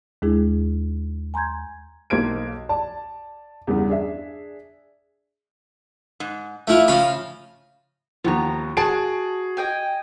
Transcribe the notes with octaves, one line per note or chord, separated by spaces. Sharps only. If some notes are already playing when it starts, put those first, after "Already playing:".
D#2 G#3 D4 E4 G#4
G#5 A#5 C6 G6 G#6
B1 A#3 C5 G#6 D7
D5 A5
E2 G2 C#3 B3
D4 G#4 E5
G#2
A3 E4 F4 E5 F5
C#3 F3 C#4 F5 B5
D#2 F3 B3 A#5
F#4 G#4 A5 D7
D#5 G5 G#5